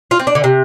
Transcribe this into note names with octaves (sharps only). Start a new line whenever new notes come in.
F4
C4
D4
D3
C3